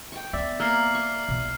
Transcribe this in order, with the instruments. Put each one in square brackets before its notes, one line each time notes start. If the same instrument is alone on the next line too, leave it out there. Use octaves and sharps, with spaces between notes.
[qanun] G5 C#6
[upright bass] B3 [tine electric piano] D5 E5
[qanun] A#3 [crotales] E6 F6 C7
[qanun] C#6
[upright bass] B1